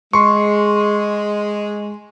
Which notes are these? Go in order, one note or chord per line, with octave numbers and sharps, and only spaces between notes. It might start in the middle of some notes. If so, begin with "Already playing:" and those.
G#3 C6 C#6